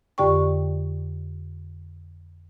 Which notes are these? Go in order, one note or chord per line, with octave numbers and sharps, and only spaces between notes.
F2 D3 G4 D5 G5 C#6